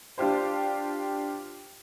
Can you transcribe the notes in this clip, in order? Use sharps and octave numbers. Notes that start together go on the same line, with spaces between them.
D4 F4 G4 C5